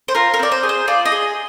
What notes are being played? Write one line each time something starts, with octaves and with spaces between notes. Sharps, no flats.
C5
F4 A#4
A#4
C4 D5
C5
G#4
C5
F4 D5
D#5
G#4